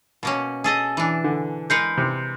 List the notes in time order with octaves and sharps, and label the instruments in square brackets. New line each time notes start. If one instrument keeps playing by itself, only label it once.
[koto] B2 A#3 C#4
[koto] G#4 A4 D#5 [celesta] G#5
[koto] E3 D4
[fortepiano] D3
[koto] G#3 A#4 B4 [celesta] G6 C7 C#7
[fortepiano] C3